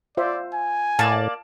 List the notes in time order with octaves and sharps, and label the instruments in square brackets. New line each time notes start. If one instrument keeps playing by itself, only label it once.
[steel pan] F4 C5 E5 [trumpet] D5
[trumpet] G#5
[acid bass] A2 [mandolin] A#3 D5 [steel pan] A5